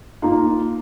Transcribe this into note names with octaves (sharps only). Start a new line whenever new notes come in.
A#3 D#4 F4